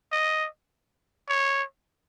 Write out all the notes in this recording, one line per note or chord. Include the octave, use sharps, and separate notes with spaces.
D#5
C#5